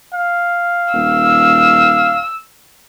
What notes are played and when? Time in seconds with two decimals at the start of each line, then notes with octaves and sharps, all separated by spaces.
0.14 F5
0.94 D#1 E6